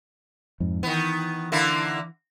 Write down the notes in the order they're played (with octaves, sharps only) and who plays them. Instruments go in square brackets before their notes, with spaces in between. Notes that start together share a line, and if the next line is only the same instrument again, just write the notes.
[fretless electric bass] F2 G#2
[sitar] D#3 B3 [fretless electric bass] E3
[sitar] D3 A#3 E4